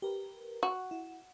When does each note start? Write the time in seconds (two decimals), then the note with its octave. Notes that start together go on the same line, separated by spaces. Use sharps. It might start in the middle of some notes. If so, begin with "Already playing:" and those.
0.02 G4 A#4 B4
0.63 F#4
0.91 E4